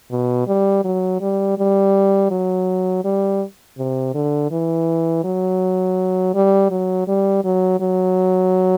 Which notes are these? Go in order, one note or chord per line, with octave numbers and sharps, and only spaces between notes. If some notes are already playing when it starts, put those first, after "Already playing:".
B2
G3
F#3
G3
G3
F#3
G3
C3
D3
E3
F#3
G3
F#3
G3
F#3
F#3